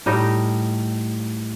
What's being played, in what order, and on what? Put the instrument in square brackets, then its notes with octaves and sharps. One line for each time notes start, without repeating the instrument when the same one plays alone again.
[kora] A2 G3 D#4 D#5